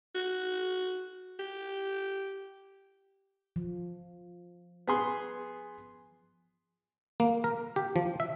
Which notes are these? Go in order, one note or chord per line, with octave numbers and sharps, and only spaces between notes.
F#4
G4
F3
B3 G#4 C6
A#3
A#4
G4
F3
E5